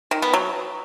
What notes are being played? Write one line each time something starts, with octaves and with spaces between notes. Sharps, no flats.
D#3
B3
F#3